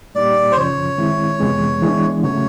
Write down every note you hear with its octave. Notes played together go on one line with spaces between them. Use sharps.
A#2 G3 A#3 D#4 G4 D5
C5
F#2 C#3 F3 C#5
D#3 G#3 C4 E4
F2 C3 E3 G#3 B3
E3 G#3 B3 D4
C#3 F#3 A3 C#5